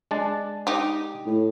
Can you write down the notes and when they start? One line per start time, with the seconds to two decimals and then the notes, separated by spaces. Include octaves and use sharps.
0.11 G#3 D4 A5
0.67 D#4 G4
1.27 A2